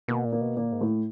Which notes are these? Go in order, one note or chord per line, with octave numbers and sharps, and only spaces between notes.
B2 A#3
A#2
A#3
B2
A#2 A#3
G#2
A2